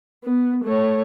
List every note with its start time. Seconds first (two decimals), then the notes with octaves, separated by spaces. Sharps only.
0.25 B3
0.64 A3 C#5